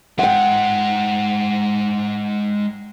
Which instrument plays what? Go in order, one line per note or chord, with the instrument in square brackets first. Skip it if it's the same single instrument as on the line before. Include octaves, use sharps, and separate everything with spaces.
[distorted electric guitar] G#3 C5 [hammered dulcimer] F#5 G5